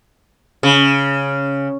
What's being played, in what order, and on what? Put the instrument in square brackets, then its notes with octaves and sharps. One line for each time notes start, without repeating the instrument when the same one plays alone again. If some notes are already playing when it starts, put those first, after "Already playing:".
[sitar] C#3